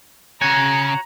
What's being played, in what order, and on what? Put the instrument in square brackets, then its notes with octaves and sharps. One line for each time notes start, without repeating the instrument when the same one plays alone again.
[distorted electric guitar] C#3 G#5 [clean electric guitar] F#4 C#5 [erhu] A#5